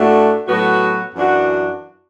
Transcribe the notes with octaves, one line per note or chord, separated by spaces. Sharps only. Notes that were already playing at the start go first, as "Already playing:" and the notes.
Already playing: A2 A3 D4 F#4
A2 F#3 B3 F#4
F#2 E3 D4 F#4